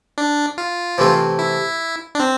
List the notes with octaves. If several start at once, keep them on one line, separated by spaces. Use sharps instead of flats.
D4
F4
C3 E3 A3 C4
E4
D4
C4